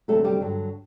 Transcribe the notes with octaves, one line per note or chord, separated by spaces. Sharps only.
D2 C3 F#3 A3 A4
G3 G4
G2 D3 F#3